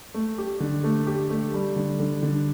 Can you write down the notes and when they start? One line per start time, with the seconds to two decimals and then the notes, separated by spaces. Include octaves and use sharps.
0.14 A3
0.38 G4
0.60 D3
0.84 A3
1.07 G4
1.30 A3
1.54 G3
1.76 D3
2.00 D3
2.23 D3